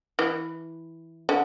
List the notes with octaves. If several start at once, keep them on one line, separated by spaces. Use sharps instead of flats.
E3
D3